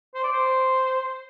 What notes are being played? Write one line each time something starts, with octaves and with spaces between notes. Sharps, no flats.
C5
D5
C5